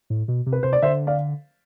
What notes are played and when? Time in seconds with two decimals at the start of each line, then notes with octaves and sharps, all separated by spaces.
0.10 A2
0.28 B2
0.46 C3
0.53 B4
0.63 C3 C5
0.73 D5
0.82 D3 C5 E5
1.07 D5 F5